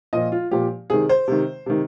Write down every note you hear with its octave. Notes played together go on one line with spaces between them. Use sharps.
A#2 F3 D#5
F4
A#2 F3 G4
C3 D#3 G#4
C5
C3 D#3
C3 D#3